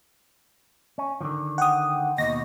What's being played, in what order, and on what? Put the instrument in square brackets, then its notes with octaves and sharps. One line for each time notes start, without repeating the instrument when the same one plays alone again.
[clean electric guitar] C#4
D3 D#3 F3
[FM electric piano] F#5 G5 D#6
[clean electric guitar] D#2 B2 [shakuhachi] D#5 [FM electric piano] A#6